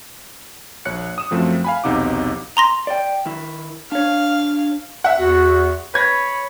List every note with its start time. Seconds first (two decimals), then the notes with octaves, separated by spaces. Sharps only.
0.85 A#1 C#5 F#6 C#7
1.18 D#6 E7
1.31 F#2 F3 A3 C4
1.64 F5 G#5 B5
1.84 B1 E2 C3 D#4 F#5 D6
2.57 A#5 C6 A#6
2.87 D5 D#5 G5
3.26 D#3 E4
3.92 D4 C#5 F5
5.04 E5 F#5
5.19 E2 F#4
5.94 B4 C#5 B5 G#6 A#6